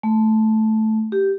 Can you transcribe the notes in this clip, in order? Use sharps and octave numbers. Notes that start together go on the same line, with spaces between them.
A3
G4